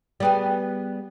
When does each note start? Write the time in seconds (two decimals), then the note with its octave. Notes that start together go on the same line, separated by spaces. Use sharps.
0.20 G3 B3 G#4